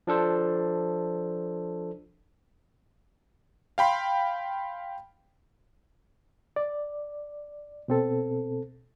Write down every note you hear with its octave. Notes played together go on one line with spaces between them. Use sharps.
F3 D4 A4 C5
F5 G5 B5 C6
D5
B2 C4 A4